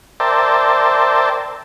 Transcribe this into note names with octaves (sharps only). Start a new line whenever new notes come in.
A#4 C5 D5 E5 G5 A5